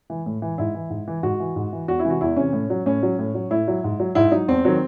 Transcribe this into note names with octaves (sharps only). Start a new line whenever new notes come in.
E3
A2
E3
G#2 E4
E3
G#2
E3
G#2 F#4
E3
G#2
E3
E2 F#4
E4
C3 E3
F#4
E2 E4
C3 E3 C#4
A2
F#3
A2 C#4
F#3
A2
F#3
A2 E4
F#3
G#2
F#3
G#2 E4
F#3 D#4
E2 C4
D#3 F#3